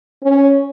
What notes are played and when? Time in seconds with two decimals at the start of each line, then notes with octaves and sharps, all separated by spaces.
0.23 C#4